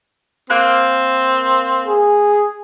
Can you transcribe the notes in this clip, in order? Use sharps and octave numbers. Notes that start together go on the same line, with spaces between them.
A#3 C4 F#6
G#4